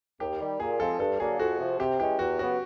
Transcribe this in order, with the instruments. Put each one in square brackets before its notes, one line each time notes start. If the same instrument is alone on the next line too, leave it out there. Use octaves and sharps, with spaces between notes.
[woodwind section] D#2 [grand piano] G4
[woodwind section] D#3 G3
[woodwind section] A#2 [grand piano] G#4
[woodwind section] F3 G#3 C4 F4 [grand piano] A4
[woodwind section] G2 [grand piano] A4
[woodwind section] D3 F#3 A#3 D4 [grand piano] G#4
[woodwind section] F2 [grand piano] F#4
[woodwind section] C3 F3
[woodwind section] C3 [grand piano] G4
[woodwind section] E3 G#3 C#4 [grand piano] G4
[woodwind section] E2 [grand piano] F#4
[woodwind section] C#3 F#3 B3 [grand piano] F#4